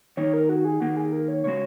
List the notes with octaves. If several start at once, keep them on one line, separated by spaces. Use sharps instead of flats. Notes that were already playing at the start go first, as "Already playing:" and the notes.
D#3 A#3 D#4 C#5
A#4
F#4
G#4
D#3 A#3 D#4 F#4
G#4
A#4
C#5
C#3 G#3 F#4 C#5